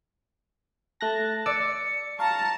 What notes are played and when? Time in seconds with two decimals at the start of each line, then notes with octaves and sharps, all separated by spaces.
1.01 A3 A5 F#6 A#6
1.46 D5 E6 C#7
2.19 F5 A5 A#5 C#6